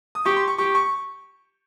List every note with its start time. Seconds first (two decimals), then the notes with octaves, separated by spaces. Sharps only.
0.15 D#6
0.25 G4 C#6
0.36 C6
0.48 C#6
0.58 G4 C#6
0.75 C#6